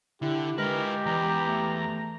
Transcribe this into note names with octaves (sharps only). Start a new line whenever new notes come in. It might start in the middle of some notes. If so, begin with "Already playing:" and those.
D3 E4 G4
G#3 F4 G4 A#4 B4
E2 A#5
A3